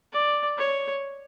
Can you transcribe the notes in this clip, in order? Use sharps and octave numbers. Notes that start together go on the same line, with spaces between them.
D5
C#5